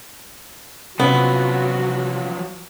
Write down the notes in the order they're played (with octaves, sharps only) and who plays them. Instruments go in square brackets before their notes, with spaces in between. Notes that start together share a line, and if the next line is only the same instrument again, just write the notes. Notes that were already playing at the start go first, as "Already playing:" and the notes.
[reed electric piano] C3 C#4 [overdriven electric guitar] F3 F#3 [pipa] B3 [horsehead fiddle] F#4